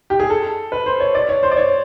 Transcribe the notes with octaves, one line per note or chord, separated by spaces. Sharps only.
G4
G#4
A4
B4
C5
C#5
D5
C#5
C5
D5
C#5